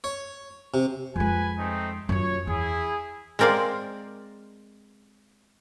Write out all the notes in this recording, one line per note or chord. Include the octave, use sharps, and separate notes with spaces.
C#5
C3
F2 G#3 B4 G#5
A3 C4 D#4
F#2 F4 C#5
E2 E4 G#4
G#3 C4 A#4 D5 F5